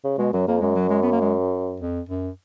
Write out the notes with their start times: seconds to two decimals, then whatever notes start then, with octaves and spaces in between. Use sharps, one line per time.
0.04 C#3
0.18 B2 G#3
0.33 F#2 F#3
0.48 F2 A#3
0.61 F#2 G#3
0.75 F#3
0.89 G#3
1.02 B3
1.12 A#3
1.21 G#3
1.80 F2
2.09 F#2